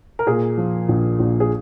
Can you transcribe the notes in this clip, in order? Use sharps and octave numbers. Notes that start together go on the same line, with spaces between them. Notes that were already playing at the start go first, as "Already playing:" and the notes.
A#4
A#2 G#4
F3
A#1
A#1
G#4